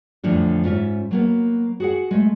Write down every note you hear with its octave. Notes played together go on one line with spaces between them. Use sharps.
F2 A2 D3 E3 F3 D4
G#2 C#4 F4 E5
F#3 A#3 B3
F#4 G#4 F#5
G#3 A3